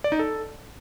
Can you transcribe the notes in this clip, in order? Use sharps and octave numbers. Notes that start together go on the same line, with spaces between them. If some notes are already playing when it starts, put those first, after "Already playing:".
D5
D#4
A4